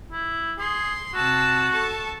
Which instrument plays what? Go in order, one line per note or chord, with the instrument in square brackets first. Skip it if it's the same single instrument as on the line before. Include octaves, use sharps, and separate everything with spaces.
[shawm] E4
[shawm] G#4 [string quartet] C6
[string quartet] C3 A5 E6 [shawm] F#4
[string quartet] A4 A5 C#6